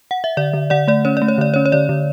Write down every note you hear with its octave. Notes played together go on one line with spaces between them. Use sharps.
F#5
E5
D3 D5
D3
D3 D5 F#5
A3 D5
C#4 C#5
A3 D5
C#5
D3 D5
C#4 C#5
C#5
D3 D5
D3